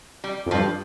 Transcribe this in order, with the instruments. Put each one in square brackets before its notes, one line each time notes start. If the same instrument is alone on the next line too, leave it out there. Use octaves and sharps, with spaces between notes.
[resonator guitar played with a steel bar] G3
[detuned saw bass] F2
[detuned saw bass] G2 [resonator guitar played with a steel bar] F3